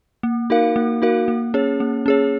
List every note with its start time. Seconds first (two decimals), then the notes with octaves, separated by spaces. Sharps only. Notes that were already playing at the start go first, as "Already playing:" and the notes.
0.23 A#3
0.50 D#4 F#4 A#4 F5
0.76 A#3
1.02 D#4 F#4 A#4 F5
1.28 A#3
1.54 C#4 G#4 C#5
1.80 A#3
2.06 C#4 G#4 C#5